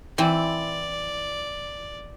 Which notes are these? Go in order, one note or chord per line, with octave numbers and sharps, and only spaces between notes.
E3 C4 E4 D5